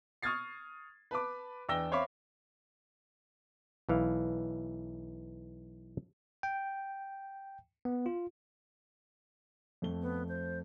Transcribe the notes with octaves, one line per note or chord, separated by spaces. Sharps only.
C#6 D#6 F6 G#6 A6 C7
B4 A5 B5 D6
E2 D4 G5 E6 A#6 G7
C5 C#5 E5 F5 B5 D6
B1 E3 F5
G5
B3
F4
F2 A3 G7
B3
C5